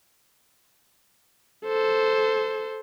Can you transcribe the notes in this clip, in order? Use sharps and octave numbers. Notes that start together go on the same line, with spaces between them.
A4 C5